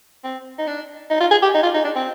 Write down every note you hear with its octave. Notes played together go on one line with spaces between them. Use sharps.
C4
D#4
D4
D#4
F4
G#4
G4
D#4
F4
D#4
D4
C4